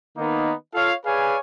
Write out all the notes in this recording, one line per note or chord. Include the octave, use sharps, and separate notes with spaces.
D#3 A#3 B3 D#4
F4 A4 C#5 F5
G#4 B4 C#5 D5 F5 G#5